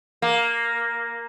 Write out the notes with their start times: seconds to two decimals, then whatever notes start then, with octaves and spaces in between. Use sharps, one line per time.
0.22 A#3